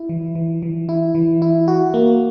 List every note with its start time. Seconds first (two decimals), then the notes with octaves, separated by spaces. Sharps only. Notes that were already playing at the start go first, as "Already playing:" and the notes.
Already playing: E4
0.09 E3
0.35 E3
0.62 E3
0.89 E4
1.15 E3
1.42 E4
1.68 F#4
1.94 A#3